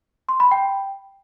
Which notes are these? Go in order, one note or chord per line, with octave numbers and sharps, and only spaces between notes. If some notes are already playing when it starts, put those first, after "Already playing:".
C6
B5
G5